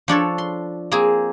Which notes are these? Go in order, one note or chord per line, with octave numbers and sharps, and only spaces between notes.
F3 D4 A4 C#5
C6
A#3 C4 G#4